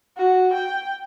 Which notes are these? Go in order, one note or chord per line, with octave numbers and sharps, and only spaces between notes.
F#4
G5